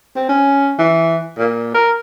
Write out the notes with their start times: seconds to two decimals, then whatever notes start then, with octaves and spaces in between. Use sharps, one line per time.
0.16 C4
0.29 C#4
0.79 E3
1.38 A#2
1.74 A#4